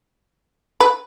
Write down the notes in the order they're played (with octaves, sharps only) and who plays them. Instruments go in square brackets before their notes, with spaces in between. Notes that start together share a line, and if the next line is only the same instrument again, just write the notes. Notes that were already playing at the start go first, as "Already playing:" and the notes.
[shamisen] B4